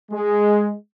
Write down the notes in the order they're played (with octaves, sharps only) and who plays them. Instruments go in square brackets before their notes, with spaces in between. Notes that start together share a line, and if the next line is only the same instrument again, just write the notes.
[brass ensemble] G#3